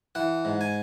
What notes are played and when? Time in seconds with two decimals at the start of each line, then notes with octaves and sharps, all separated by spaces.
0.15 E3 F#5
0.45 G#2
0.61 G#5